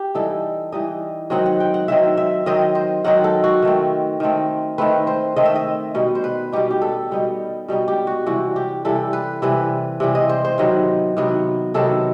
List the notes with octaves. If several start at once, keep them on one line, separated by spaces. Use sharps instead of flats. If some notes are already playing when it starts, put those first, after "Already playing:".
Already playing: G4
E3 G3 D#4 A4
E3 G3 D#4 D#5
D#3 F#3 C4 D#4 F#5
F#5
G5
F#5
D#3 F#3 C4 D#4 E5
E5
D#3 F#3 C4 D#4 D#5
C5
D#3 F#3 C4 D#4 F#5
A4
F#4
D#3 A3 C4
D#3 A3 C4
D#3 A3 C4 B4
C5
D#3 A3 C4 D#5
E5
D#5
B2 G3 B3 D#4
C5
B4
B2 G3 B3 D#4 G4
G4
A4
B2 G3 B3 D#4
B2 G3 B3 D#4
G4
F#4
C3 E3 G3 F#4
G4
C3 E3 G3 A4
B4
C3 E3 G3 B4
C3 E3 G3
D#5
C5
C5
C3 D#3 F#3 B3
C3 D#3 F#3 B3
C3 D#3 F#3 B3 A4